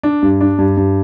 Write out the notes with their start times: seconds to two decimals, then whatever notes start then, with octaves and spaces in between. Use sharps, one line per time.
0.03 D4
0.23 G2
0.41 D4
0.58 G2
0.77 G2